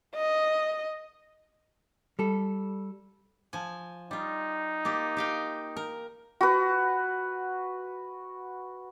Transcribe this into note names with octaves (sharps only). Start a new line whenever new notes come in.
D#5
G3 A4
F3 G#5
G3 D#4 F4
A#3 F4 G4
G4 F5 G5
A#4
F#4 B4